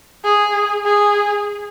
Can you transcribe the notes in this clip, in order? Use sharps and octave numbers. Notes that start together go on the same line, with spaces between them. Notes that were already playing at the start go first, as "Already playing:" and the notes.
G#4
G#4